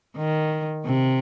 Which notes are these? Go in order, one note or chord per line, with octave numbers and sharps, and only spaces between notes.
D#3
C3